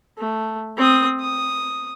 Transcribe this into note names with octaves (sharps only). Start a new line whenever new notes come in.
A3
C4 D#6
D#6